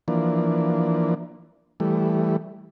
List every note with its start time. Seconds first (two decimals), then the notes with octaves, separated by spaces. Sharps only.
0.08 E3 F3 A#3 D4
1.80 E3 G3 A3